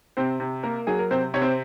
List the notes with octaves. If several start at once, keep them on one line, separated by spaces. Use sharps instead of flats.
C3 C4 C5
C3
A#3 A#4
F#3 G#4
A#4
C3 C4 C5
C3 C#5
C4 C5